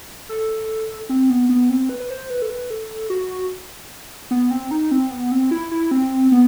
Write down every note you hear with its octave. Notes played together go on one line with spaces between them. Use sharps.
A4
C4
B3
B3
C4
B4
B4
C5
B4
A4
B4
A4
F#4
B3
C4
D#4
C4
B3
C4
E4
E4
C4
B3